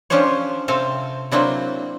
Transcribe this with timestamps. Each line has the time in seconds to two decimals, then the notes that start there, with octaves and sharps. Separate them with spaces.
0.10 F3 C#4 D4 G4 C5 C#5
0.68 C3 C4 A4 F5
1.31 F#3 A#3 C4 D4 E4